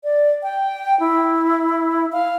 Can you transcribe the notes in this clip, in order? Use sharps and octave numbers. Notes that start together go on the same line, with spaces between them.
D5
G5
E4
F5